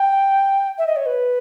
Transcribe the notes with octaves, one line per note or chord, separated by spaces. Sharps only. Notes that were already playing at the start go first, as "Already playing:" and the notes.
Already playing: G5
E5
D#5
C#5
B4